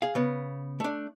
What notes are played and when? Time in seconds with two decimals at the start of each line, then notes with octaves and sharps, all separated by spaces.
0.02 G#4 F5
0.15 C#3 B3
0.80 A3 D4